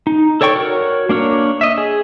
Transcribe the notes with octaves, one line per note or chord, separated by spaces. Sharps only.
D#4
A4 C#5 D5 G5 C#6
F#4 A#4 C#5
A#3 D4 A#4 C#5
D#5 E5
G#4